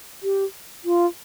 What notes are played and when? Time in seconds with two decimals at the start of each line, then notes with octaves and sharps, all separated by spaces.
0.23 G4
0.85 F4